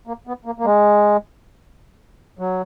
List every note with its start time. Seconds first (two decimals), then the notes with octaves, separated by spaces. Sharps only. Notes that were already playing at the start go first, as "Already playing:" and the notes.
0.07 A#3
0.27 B3
0.45 A#3
0.58 A#3
0.65 G#3
2.39 F#3